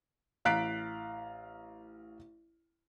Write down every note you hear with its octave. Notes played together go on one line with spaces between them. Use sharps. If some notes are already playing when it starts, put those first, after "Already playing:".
A1 F5 A#5 F#6 B6 D7